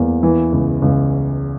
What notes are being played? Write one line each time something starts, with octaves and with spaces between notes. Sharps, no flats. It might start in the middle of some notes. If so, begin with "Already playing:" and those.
Already playing: E2 A#3
E3
C#2
C#2